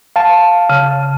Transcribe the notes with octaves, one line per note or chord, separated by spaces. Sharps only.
F5 A5
C#3